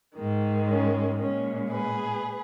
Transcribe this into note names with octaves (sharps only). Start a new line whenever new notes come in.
G#2 D#3 G#3
C#4
A#2 G#3 C#4
G#4 B4